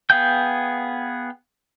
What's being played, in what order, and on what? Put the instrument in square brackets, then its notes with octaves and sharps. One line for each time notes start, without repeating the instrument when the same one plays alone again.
[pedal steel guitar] B3 G#4 F5 G5 G6